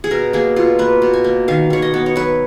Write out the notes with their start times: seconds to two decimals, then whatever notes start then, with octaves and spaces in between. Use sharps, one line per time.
0.04 G#4
0.11 B2 A#4
0.33 A#3 G#4
0.56 B2 F4
0.79 A#3 B4
1.02 B2
1.14 G#5
1.24 A#3
1.48 D#3 F5
1.70 D#3 C#5
1.82 D#5
1.94 B3
2.06 C#5
2.16 F#3 B4